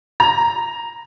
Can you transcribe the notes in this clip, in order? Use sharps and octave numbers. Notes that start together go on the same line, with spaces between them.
A#5